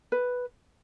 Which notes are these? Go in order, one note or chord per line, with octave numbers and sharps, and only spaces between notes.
B4